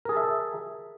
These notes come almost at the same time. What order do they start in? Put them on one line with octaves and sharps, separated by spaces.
A#4 G#4 A5 E5